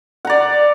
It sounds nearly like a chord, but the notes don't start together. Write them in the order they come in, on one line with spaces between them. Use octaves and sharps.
F#5 A#5 D5